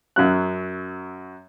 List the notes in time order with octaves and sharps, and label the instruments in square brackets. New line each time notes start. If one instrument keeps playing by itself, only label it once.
[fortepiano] F#2 F#3 F#6